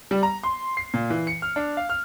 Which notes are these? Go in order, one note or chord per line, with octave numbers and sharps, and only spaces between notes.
G3
A#5
C6
C7
A#2
E3
C#7
F6
D4
F5
F6